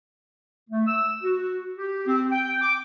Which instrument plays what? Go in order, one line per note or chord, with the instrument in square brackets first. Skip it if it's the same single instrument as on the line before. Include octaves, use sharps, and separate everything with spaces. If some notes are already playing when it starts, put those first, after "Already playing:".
[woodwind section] A3
E6
F#4
G4
C4
G5
D6